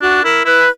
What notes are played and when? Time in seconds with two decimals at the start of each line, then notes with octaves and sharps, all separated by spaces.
0.02 D4 F#4
0.24 E4 A#4
0.45 E4 B4